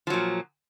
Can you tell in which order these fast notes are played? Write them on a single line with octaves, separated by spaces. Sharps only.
F3 F#3 A#2